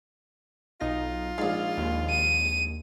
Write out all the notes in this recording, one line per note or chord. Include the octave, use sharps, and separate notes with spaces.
B1 D#4 F4 A#6
A#1 G#2 F5
D#2
D#7